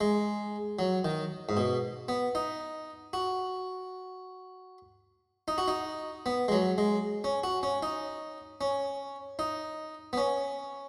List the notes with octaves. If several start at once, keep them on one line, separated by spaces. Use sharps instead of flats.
G#3
F#3
D#3
G#2
B2
B3
D#4
F#4
D#4
F#4
D#4
B3
G#3
F#3
G#3
C#4
F#4
C#4
D#4
C#4
D#4
B3
C#4